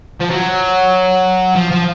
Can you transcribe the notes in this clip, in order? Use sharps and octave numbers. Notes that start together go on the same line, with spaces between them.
F3
F#3
F3
F3